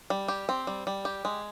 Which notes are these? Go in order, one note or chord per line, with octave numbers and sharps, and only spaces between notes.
G3
G4
C4
G3
G3
G4
G#3